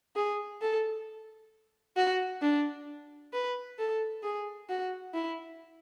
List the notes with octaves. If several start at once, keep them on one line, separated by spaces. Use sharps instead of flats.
G#4
A4
F#4
D4
B4
A4
G#4
F#4
E4